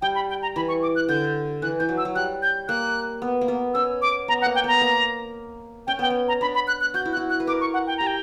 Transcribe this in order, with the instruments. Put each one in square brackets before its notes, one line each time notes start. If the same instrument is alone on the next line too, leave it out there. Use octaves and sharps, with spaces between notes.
[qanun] G3 [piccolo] G5
[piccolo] B5
G5
A#5
[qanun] E3 [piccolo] B5
[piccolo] C#6
D6
F#6
[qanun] D3 [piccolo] G6
[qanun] E3 [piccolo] F#6
[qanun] E3 [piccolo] G6
[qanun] F#3
[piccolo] E6
[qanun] F#3
[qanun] G3 [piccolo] F#6
[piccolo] G6
[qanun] A#3 [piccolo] F#6
[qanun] B3
A#3
B3
[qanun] C#4 [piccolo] E6
[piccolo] D6
[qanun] B3 [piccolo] A#5
[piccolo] F#5
[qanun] A#3
[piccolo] G5
[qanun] B3 [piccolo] A#5
[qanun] A#3
[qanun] C#4 [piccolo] G5
[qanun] B3 [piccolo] G5
[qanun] C#4
[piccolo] A#5
[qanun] D4 [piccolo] B5
[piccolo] B5
F#6
F#6
[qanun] F#4 [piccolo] G6
[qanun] E4
[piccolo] F#6
[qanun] F#4
[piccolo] F#6
[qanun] B4
[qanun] A#4 [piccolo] D6
[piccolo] C#6
F#5
G5
[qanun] G4 [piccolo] A#5
[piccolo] G5